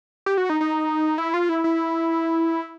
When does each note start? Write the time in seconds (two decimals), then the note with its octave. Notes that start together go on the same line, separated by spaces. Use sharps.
0.26 G4
0.38 F#4
0.50 D#4
0.61 D#4
1.18 E4
1.34 F4
1.49 E4
1.64 E4